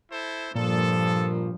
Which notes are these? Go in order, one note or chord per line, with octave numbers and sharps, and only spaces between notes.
E4 A4 C5
G2 A#2 F3 A4